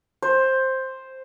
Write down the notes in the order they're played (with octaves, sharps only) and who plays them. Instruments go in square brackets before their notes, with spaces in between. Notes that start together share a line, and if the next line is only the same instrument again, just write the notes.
[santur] C5